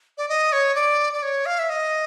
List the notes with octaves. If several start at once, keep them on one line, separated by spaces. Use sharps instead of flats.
D5
D#5
C#5
D5
D5
C#5
F5
E5
D#5